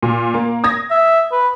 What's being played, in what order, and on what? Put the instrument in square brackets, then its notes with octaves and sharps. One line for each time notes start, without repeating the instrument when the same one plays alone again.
[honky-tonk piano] A#2
A#3
D#6 G#6 A#6
[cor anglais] E5
B4